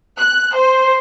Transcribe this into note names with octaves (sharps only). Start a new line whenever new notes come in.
F#6
C5